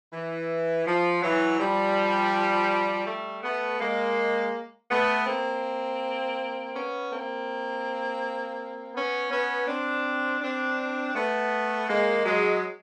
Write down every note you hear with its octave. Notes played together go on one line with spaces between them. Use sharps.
E3
F3
E3 F#3
F3 G3
G3 A3
A3 B3
G#3 A#3
A3 B3
A#3 C4
B3 C#4
A#3 C4
B3 C#4
B3 C#4
C4 D4
C4 D4
A3 B3
G#3 A#3
F#3 G#3